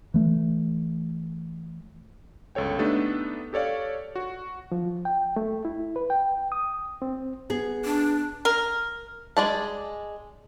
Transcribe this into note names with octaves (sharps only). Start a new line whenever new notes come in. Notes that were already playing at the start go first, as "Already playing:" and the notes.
E3 A3
G1 C#2 A4 C#5 G5
A3 B3 D4 D#4 G4 A4
G4 A4 C#5 D5 F5
F#4
F3
G5
A3
E4
B4
G5
D#6
C4
B3 G#4
D4
A#4
G#3 D5 A5